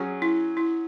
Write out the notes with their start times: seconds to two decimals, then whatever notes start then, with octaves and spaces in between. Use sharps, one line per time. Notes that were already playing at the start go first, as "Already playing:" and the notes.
Already playing: F#3 C#4 G#4
0.22 E4
0.57 E4